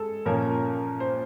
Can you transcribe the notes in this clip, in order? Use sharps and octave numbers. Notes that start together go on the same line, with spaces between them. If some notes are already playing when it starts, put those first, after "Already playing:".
Already playing: G#3 A4
A#2 F3 A#3 C#4 A#4
C5